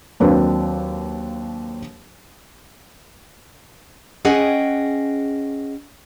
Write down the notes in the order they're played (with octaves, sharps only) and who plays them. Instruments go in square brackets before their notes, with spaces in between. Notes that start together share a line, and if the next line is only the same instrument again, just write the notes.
[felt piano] D#2 F#3 A#3 C4 D4 B4
[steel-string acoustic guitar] C#4 G#4 D#5 F#5 G5